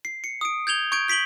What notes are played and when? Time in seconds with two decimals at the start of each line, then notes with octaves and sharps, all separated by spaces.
0.05 C7
0.24 C#7
0.41 D#6 D7
0.67 G6 G#6 F7 G7
0.92 C#6 G6 G#6 D7
1.08 G6 B6 D7 F#7 G7